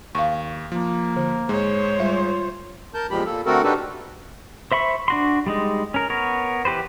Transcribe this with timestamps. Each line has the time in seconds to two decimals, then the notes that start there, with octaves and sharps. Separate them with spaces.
0.15 D#2 F5 C#6
0.72 F3 A#3
1.17 D3
1.49 G#2 G#3 C5 C#5
2.00 G3 F4 E5
2.94 A#4 A5 G6
3.11 E2 A#2 F3 G#3 G4 B5
3.26 A#2 A#3 A4
3.46 D3 A3 C4 F#4 A4 A#4
3.64 D4 D#4 F#4 G4 A4 B4
4.72 C5 E5 B5 C#6
5.08 D4 F#4 C6
5.46 G3 G#3 D#4
5.94 C#4 A#4
6.10 B3 A#4 C#5
6.65 E3 G4 B4 C5